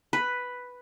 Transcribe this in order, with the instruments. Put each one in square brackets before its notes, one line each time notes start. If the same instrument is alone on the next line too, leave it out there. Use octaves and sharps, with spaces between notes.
[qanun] B4